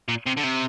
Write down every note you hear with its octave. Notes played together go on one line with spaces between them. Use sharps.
A#2
C3
D3
C3